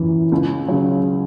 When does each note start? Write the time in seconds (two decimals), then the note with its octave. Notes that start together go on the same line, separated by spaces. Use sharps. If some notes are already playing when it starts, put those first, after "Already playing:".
Already playing: F#2 E3
0.32 C#2
0.68 C#3 F#3